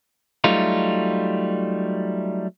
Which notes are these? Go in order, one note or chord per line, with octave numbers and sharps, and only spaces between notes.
F#3 G3 A3 D#4 F4